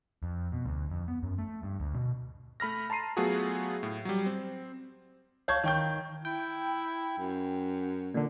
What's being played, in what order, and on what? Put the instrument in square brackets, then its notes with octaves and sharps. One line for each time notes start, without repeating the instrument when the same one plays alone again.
[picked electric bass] F2
B2
D2
F2
B3
F#2
A3
G2
D2
B2
[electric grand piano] A3 B5 F6 A#6
A5 A#5 C6 C7 D#7
F#3 A3 B3 F4 F#4 G#4
A2
F#3 G3
C4
[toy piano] C#5 C#6 [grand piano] F5 A5 G#6
[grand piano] D#3 G5 G6
[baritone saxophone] E4 [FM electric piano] G5
[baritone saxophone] F#2
[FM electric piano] A#2 D3